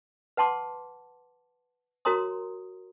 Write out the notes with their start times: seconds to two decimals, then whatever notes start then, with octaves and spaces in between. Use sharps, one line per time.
0.37 B4 F#5 A5 C6 D6
2.05 F#4 A#4 C#5 A#5 C6 D#6